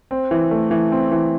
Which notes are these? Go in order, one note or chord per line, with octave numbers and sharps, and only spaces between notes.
C4
E3
A3
E3
C4
E3